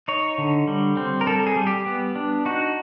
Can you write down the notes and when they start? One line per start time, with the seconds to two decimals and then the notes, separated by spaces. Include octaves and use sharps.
0.08 D#4 C#5
0.38 D3
0.68 G3
0.97 C4
1.21 A#4
1.27 G3 A4
1.47 G#4
1.56 G3
1.67 G4
1.86 B3
2.16 D4
2.45 D#4 F#4